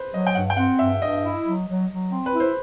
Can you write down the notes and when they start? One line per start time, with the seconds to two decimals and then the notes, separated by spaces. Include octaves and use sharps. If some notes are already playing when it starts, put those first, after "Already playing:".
Already playing: B4 C5
0.13 F#3 D#5
0.27 G5
0.35 G2 F#5
0.50 G5
0.57 C4 F#5
0.79 G2 E5
1.01 G2 D#5
1.24 E4
1.45 F#3
1.68 F#3
1.90 F#3
2.11 C4
2.26 B4
2.33 E4
2.40 C5